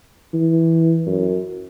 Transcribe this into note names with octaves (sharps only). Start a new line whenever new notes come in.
E3
F#2